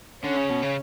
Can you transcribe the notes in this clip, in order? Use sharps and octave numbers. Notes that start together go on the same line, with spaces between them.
D3 C#4
C#3
B2
C#3